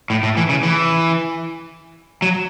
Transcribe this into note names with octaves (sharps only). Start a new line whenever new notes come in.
A2
A2
E3
C#3
E3
F#3